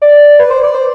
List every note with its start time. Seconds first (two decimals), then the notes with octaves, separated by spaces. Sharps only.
0.02 D5
0.39 B4
0.50 C5
0.63 D5
0.75 C5